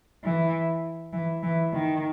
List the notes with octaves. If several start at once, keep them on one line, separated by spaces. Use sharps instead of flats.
E3
E3
E3
D#3